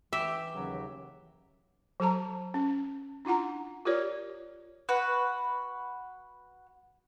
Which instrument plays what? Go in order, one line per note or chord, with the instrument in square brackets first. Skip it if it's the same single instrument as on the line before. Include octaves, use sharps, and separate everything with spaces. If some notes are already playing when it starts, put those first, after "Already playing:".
[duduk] E3 [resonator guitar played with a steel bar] G4 [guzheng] E5
[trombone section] D#2 C#3 F#3
[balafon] F#3 A4 A5 A#5
C#4
D4 E4 F4 F#5 A#5
F4 G4 A#4 C#5 D5
[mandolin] F#4 B4